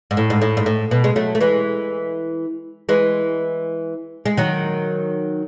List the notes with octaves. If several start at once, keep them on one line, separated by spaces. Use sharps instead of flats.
G#2
A2
G#2
A2
G#2
A2
B2
G#3
F#3 A3
A3
E3 G#3
E3 G#3
G#3
D#3 F#3